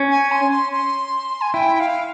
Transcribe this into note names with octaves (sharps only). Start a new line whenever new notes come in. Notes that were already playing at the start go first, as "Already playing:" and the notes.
Already playing: C#4
G#5
C6
C6
C6
G#5
E4 G5
F5